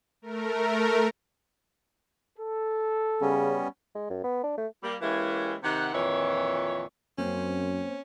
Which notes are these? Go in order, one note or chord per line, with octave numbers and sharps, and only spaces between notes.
A3 A#4
A4
C#3 G3 B3 C#4
G#3
F#2
B3
D4
A3
G3 A#3
E3 G#3 A#3 C#4 E4 G4
C3 D#3 G4 F#5
F2 A#2 D#3 E3 C#5
F#2 A#3 C4 C#4 C5